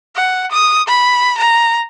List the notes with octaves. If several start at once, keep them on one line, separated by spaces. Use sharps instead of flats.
F#5
D#6
B5
A#5